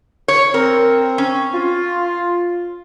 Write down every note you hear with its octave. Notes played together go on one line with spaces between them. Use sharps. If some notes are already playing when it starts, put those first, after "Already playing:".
C#5
C4 A#4
C#4
F4